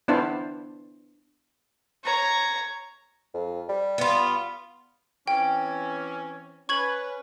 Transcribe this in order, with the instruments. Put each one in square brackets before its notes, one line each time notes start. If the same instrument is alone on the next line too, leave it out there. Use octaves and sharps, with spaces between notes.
[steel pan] B3 D4 E4 C5 F5 A5
[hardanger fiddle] C#5 A#5
[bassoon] F2
G3
[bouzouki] B3 F4
[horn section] E3 C4 C#4 [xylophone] G5
[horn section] C#4 B4 [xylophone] C#6 G#6 F#7